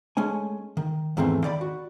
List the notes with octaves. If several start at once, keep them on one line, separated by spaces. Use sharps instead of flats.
G#3 A3 C#4 G#5
D#3
E2 G#2 D#3 E3 A3 C4
D#3 D5 B5
F#4